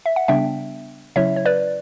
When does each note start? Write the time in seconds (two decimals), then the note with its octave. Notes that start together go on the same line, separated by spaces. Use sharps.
0.06 E5
0.16 F#5
0.28 C#3 G3 B3 D4 E5 G5
1.16 C#3 F#3 C#4 E4 C#5 E5
1.36 C#5
1.45 B4 D5